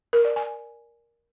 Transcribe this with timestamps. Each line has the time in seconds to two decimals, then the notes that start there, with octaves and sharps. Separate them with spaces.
0.13 A#4
0.25 D5
0.36 G#5